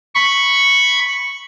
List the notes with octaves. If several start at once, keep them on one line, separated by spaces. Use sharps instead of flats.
B5 C#6